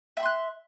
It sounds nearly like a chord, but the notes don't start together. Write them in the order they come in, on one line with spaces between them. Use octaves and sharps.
E5 B5 C6 F#6